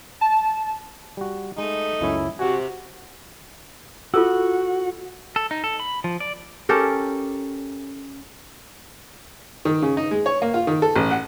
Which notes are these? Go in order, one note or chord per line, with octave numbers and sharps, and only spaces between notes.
A5
G3 F#4
G#3 A3 D#4
C#2 F#2 C#4 E4
C3 F#4 F#5 G#5
F4 F#4 A4 E6
A4
D#4
A4
B5
F3
D5
C#4 G4 A4 A#4
D#3
C#3
D#4
G#3
C#5
A#3
F4
D#3
A4
A1
F#5